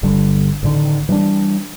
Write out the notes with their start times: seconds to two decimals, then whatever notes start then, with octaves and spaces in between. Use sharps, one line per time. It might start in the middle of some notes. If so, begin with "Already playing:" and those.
0.03 G1 D3 G3
0.63 A1 D3 D#3
1.09 E3 G3 D4